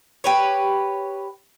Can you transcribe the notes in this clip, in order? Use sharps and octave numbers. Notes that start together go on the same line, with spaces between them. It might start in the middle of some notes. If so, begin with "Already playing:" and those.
G4 B4 C#5